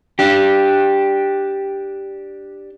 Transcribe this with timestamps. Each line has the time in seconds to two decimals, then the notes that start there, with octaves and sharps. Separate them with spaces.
0.19 D4 G4